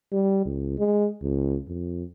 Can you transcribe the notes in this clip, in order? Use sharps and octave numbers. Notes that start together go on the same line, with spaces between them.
G3
C#2
G#3
C#2
F2